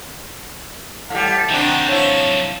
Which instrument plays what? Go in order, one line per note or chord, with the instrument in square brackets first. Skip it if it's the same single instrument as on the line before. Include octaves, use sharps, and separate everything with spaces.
[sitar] A2 G3 [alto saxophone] F#5 [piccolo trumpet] A5
[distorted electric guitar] C3 F#3 [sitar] D#3 C4 D4
[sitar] F3 E4 [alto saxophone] C#5